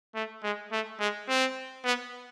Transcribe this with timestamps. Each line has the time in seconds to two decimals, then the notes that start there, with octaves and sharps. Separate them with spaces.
0.15 A3
0.43 G#3
0.72 A3
1.00 G#3
1.28 C4
1.85 B3